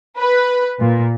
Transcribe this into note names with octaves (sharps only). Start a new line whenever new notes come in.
B4
A#2